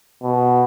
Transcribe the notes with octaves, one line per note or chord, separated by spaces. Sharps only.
B2